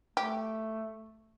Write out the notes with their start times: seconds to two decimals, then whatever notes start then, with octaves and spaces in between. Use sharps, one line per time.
0.17 A3 G4